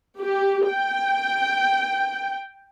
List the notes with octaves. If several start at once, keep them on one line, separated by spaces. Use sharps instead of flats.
G4
G5